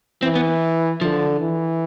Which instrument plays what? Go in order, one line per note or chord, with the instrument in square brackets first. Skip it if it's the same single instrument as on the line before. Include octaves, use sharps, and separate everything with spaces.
[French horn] E3 [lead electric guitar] C4
[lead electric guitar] B3
[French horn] D3 [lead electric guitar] F3
[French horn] E3